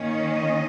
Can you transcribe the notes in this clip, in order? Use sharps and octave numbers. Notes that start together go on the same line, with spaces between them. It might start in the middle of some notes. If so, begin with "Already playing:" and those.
Already playing: D#3 A#3 C#4 C#5
D#5